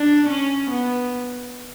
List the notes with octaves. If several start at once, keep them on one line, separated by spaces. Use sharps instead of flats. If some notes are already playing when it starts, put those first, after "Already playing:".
Already playing: D4
C#4
B3